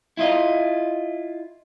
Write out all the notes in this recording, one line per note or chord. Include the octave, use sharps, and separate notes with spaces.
E4 F4 D#5